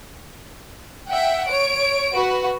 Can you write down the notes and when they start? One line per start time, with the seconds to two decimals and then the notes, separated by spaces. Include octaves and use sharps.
1.09 E5 F#5 G5
1.48 C#5 D7
2.13 F#4 B4